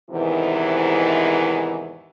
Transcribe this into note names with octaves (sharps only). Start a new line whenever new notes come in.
E2 G#2 C3 D#3 E3